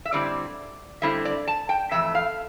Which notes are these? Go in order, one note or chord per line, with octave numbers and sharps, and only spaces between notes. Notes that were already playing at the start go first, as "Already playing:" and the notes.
E5
D3 G3 C4 E4 D5
D3 G3 C4 E4 E5
D5
A5
G5
F2 E3 A3 E5
F5